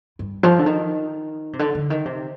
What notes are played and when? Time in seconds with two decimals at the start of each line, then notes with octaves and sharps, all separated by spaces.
0.19 G2
0.43 F3
0.59 D3
0.66 D#3
1.53 C3
1.59 D3
1.75 D3
1.90 D#3
2.05 C3